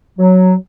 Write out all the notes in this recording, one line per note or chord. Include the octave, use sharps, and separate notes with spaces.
F#3